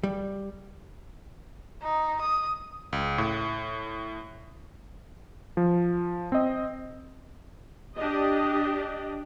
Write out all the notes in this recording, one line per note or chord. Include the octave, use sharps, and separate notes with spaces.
G3
D#4
D#6
C#2
A2
F3
C4 D#5
D4 G4 D#5